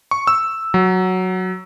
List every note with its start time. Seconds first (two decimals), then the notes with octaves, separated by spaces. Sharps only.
0.11 C#6
0.27 E6
0.74 F#3